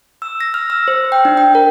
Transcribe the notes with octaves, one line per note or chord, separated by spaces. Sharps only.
E6
A#6
F6
E6
C5
G5
D4
G5
A#4